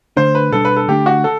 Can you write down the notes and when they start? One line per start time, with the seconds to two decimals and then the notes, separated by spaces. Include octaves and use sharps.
0.17 D3 A3 D4 C5
0.35 B4
0.52 B2 G3 D4 A4
0.65 B4
0.76 A4
0.88 D3 A3 D4 G4
1.06 F#4
1.24 A4